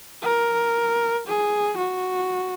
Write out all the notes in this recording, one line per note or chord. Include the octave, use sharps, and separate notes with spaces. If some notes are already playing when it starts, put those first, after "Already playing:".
A#4
G#4
F#4